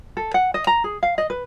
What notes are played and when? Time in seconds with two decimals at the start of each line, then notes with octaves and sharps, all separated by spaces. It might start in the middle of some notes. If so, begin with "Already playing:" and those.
0.17 A4
0.34 F#5
0.54 D#5
0.67 A#5
0.84 G#4
1.03 F5
1.18 D#5
1.30 B4